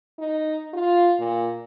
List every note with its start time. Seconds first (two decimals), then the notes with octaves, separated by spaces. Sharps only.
0.18 D#4
0.73 F4
1.19 A#2